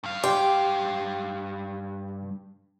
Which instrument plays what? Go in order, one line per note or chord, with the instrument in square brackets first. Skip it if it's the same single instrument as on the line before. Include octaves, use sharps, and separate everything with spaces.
[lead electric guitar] G2 F5
[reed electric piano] G4 C6 D6 [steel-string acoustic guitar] G5